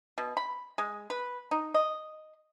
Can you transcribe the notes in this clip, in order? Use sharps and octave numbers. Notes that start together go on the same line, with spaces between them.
B2
B5
G#3
B4
D#4
D#5